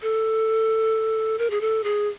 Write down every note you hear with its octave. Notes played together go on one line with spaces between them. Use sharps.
A4
A#4
G#4
A4
G#4